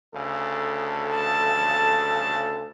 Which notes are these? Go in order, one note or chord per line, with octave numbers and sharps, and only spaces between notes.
D2 C#3 A4
A5